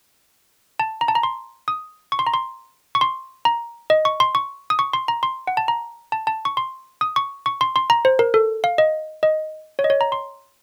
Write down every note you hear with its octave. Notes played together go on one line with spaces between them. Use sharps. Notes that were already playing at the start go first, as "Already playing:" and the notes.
A5
A#5
A5
A#5
C6
D#6
C#6
C6
A#5
C6
C#6
C6
A#5
D#5
C#6
C6
C#6
D#6
C#6
C6
A#5
C6
F#5
A5
A#5
A5
A5
C#6
C6
D#6
C#6
C#6
C6
C6
A#5
C5
A#4
A4
F5
D#5
D#5
C#5
D#5
C#5
A#5
C6